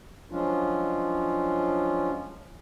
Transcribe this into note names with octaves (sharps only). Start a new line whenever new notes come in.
F3 F#3 G#3 C#4 D4 F4